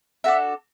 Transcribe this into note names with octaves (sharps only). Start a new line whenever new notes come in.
D4 F#4 A4 E5